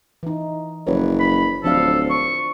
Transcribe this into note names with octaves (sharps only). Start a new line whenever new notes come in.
E3 D#4
F#1 F3 B4 C#5
B5
D1 F3 D4 A4 F5
C#6